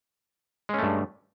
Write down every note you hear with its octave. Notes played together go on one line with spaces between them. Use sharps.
G2 G#3 A3 C#4